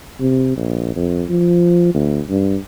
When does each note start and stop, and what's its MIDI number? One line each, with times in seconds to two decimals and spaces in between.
0.21 0.52 48
0.56 0.94 34
0.96 1.24 41
1.29 1.91 53
1.94 2.21 38
2.30 2.57 43